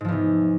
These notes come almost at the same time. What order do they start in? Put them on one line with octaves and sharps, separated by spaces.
G#2 F3 E2 C3